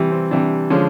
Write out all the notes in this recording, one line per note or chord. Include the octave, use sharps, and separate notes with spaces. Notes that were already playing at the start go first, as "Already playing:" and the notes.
Already playing: C3 E3 G3
C4
C3 E3 G3 D4
D3 F3 G#3 C#4